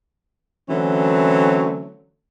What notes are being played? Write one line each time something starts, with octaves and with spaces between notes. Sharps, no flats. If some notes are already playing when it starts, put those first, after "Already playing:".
D3 E3 F#3 A3 C4 C#4